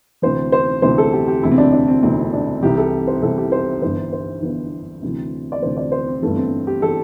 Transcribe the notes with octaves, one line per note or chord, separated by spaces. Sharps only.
D2 C3 E3 C5
C5
D2 C3 E3 C5
A4
G4
G4
E1 D2 C3 E3 E4
C4
D4
D4
C4
E1 D2 C3 E3 C4
D4
C2 C3 E3 G4
A4
C5
C2 C3 E3 A4
G4
C5
G1 G2 E3 C5
C5
G1 G2 E3
D2 C3 E3
D5
D2 C3 E3 C5
D5
C5
C4
G1 G2 E3 A3
C4
G4
E3 A4